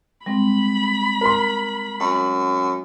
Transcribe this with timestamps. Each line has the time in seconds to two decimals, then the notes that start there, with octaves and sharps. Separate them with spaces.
0.26 G3 G#3 C4 B5
1.21 A#4 C6
2.00 F#2